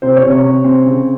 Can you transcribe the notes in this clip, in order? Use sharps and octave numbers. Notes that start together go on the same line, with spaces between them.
C3 C5
C#5
C3
C#5
C3
C4
C#3